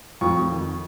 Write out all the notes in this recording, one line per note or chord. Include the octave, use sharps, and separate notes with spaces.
F2 C#6
F2
D#3